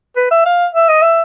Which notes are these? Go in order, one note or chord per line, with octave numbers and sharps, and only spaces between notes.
B4
E5
F5
E5
D#5
E5